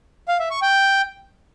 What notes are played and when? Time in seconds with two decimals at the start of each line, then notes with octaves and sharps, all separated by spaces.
0.28 F5
0.39 E5
0.51 C#6
0.62 G5